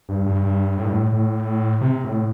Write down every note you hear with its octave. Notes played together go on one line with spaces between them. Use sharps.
G2
G2
G2
A2
G2
A2
A2
C3
A2